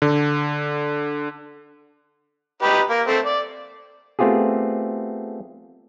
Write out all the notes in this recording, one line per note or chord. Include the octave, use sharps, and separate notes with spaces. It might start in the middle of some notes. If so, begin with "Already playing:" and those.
D3
D#4 G4 B4
A#3
A3 C4
D5
A3 B3 C4 F4 G4 G#4